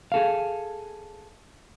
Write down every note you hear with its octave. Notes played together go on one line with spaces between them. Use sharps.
G#4 A4 F5